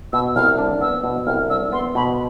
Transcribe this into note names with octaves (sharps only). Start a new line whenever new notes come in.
B2 E6
C2 F6
D4
B3 E6
B2
C2 F6
D4 E6
B3 C6
B2 B5